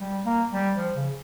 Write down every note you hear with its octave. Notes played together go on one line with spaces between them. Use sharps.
G3
A#3
G3
F3
C#3